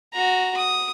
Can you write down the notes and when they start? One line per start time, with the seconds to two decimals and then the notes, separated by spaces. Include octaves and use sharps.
0.13 F#4 A#5
0.57 D#6